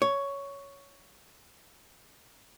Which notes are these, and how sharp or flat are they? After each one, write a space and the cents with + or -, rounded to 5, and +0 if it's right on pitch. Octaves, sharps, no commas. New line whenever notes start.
C#5 +10